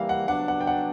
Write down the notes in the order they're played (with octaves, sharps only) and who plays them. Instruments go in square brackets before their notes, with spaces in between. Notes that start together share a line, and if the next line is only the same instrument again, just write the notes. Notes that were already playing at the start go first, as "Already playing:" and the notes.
Already playing: [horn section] E3 G3 A#3 [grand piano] F5
[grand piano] F#5
[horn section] F#3 B3 D4 [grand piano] F#5
[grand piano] F#5
G5
F#5